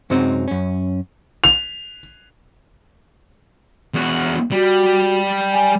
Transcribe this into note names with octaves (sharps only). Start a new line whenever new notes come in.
F#2 C3 F#3 G#3 C4 D#4
F#2 C#4
F7
E2 F#4
G3 F#4
G#5